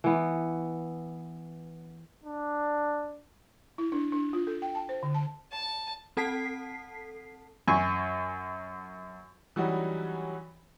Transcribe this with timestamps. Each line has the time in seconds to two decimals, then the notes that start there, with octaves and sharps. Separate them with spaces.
0.04 E3 B3
2.23 D4
3.78 E4
3.92 D4
4.12 D4
4.33 F4
4.47 A4
4.62 G5
4.75 A5
4.89 C5
5.03 D3
5.14 A5
5.53 A5
6.17 C4 A4 A5 B6 C7
7.68 F#2 G#5 C#6
9.56 E3 F#3 G3 C#4 D#4 F#4